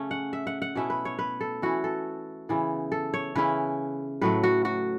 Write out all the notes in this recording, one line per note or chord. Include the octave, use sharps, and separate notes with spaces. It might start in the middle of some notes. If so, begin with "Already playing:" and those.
Already playing: C#3 A3 C#4
F#5
E5
F#5
F#5
B2 A3 C#4 E4 E5
B4
C#5
B4
A4
E3 C#4 E4 F#4
A4
C#3 E3 B3 E4
A4
C#5
C#3 E3 C#4 E4 B4
A2 F#3 A3 B4
F#4
F#4